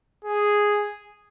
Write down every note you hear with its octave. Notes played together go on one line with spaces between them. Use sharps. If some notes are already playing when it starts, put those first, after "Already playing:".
G#4